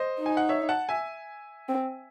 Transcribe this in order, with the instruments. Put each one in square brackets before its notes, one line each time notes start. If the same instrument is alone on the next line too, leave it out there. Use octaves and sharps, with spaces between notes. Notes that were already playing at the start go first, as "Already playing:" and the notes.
Already playing: [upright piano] C5 D#5
[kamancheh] D#4
[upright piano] G#5
F#5
C#5 E5
F#5 A5
E5 G#5
[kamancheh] C4